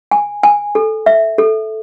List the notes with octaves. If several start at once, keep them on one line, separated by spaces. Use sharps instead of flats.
G#5
G#5
A4
E5
A4